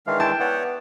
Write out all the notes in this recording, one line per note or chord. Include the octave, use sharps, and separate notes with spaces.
D#3 E3 G#3 D4 F5
E4 G5 A5 E6
B3 C#5 D5 F#5